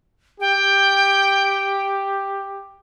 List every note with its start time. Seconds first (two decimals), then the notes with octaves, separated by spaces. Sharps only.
0.40 G4 G5